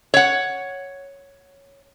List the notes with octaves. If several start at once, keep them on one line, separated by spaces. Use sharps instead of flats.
C#5 F#5